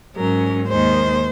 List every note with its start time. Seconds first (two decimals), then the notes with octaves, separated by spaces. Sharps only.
0.16 G#2 F#3 C#4 A#4
0.69 D#2 D#3 G#3 C5